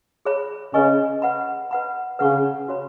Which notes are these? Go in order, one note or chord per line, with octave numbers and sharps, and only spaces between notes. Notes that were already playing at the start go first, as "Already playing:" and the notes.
G#4 C#5 B5
C#3 B4 D#5 G#5 C#6
B4 F#5 B5
B4 F#5 B5
C#3 B4 F#5 C#6
F#4 C#5 B5